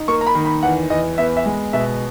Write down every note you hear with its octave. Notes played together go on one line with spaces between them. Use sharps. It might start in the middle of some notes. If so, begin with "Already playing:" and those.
Already playing: D#4
A#3 C#6
A#5
B5
D#3
B5
E2 F#5
E2 D#5
B3 E5
E5
G#3
B2 E5